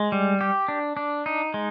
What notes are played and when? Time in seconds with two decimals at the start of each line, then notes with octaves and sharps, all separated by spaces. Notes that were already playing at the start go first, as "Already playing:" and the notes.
Already playing: G#3
0.12 G3
0.41 G4
0.68 D4
0.97 D4
1.26 D#4
1.54 G#3